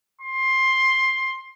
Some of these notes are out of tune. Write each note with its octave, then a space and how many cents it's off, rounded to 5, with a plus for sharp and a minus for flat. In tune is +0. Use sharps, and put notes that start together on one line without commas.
C6 +15